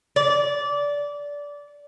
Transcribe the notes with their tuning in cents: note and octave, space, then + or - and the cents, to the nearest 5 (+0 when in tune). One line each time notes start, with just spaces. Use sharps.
D5 -20